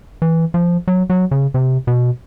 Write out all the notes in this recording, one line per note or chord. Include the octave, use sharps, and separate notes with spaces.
E3
F3
F#3
F#3
C#3
C3
B2